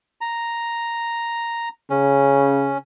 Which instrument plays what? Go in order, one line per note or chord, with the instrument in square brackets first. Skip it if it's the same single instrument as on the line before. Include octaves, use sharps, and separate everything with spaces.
[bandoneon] A#5
[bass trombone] C#3 [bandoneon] C#4